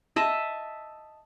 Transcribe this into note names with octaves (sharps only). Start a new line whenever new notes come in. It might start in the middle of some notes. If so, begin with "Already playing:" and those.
D#5 E5 A5